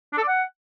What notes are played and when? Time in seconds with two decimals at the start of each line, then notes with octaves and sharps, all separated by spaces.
0.13 D4
0.18 A4
0.23 D5
0.28 F#5